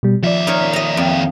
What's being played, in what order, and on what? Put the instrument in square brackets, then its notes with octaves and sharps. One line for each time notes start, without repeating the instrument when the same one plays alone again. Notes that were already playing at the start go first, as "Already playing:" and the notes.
[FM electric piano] B2 G3
[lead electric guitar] D#2 E5 [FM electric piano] F3 D5
[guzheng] D#4 A#4 C#5
D#5 A#5
F2